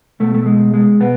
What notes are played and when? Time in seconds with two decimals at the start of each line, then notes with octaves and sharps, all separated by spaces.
0.20 B2 A3
0.34 A3
0.46 G#3
0.74 G#3
1.00 B2 B3